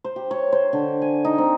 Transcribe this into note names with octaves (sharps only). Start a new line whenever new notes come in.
C5
G4
C#5
C5
D3
G#5
D#4
C4